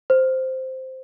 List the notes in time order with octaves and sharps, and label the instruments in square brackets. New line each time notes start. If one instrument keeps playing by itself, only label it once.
[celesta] C5